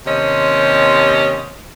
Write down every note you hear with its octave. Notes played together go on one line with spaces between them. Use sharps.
D#2 C3 C#4 C5 D#5